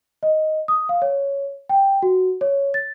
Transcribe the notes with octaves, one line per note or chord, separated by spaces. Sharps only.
D#5
D#6
F5
C#5
G5
F#4
C#5
A6